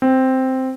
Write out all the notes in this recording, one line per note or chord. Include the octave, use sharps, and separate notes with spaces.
C4